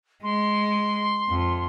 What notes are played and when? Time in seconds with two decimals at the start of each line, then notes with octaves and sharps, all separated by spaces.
0.23 G#3 C6
1.29 F2